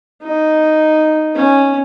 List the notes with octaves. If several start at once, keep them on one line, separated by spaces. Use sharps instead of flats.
D#4
C#4